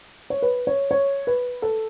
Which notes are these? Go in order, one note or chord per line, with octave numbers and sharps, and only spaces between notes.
C#5
B4
C#5
C#5
B4
A4